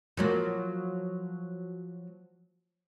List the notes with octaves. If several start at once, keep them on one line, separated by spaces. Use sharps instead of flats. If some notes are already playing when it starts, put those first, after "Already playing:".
F3 F#3 A#3